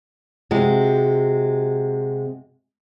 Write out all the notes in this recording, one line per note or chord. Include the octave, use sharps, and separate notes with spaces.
C3 G#3 F#4